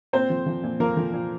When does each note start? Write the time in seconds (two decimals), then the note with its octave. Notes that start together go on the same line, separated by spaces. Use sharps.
0.13 A#2 C4 C5
0.30 F3
0.46 F3
0.63 A#2
0.80 F3 A#3 A#4
0.97 F3
1.14 A#2